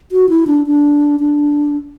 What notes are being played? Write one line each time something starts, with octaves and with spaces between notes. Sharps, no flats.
F#4
E4
D4
D4
D4